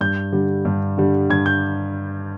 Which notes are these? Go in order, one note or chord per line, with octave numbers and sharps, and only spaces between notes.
G2 G6
D3 G3
G2
D3 G3
G2 G#6
G6